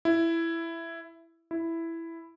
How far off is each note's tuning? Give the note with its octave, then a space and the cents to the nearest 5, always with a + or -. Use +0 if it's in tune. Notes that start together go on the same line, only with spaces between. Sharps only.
E4 +10
E4 +5